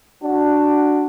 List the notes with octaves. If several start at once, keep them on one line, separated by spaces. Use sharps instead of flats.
D4 F#4